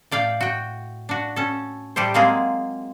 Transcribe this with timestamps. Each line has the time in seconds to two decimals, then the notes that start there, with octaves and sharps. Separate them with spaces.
0.11 A2 D5 F5 G5
0.41 F#4 G5
1.09 D4 F#4
1.36 C#4 A4
1.96 A2 G3 G4 A4 C5
2.14 F#3 G#3 A#3 C4 F4 G#4